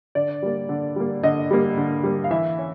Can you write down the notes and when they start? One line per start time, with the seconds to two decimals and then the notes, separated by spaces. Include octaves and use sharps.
0.15 D3 D5
0.42 G3 A#3
0.69 D3
0.96 G3 A#3
1.23 D3 D#5
1.51 G3 A#3
1.77 D3
2.03 G3 A#3
2.24 F5
2.30 E3 E5
2.58 C#4